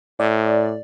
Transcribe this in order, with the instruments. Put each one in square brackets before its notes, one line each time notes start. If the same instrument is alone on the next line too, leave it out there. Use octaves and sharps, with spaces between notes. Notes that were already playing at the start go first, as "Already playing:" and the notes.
[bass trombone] A2 [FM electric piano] D5